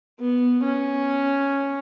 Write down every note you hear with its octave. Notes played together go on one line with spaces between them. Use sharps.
B3
C#4